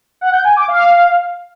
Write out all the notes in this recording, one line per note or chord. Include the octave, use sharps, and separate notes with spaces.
F#5
G6
G#5
D6
F5